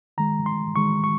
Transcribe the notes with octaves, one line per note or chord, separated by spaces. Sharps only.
D#3 G#3 A#5
C6
D#3 G#3 C#6
C#6